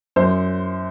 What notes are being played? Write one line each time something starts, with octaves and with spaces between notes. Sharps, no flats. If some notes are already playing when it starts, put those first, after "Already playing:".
F#2 C5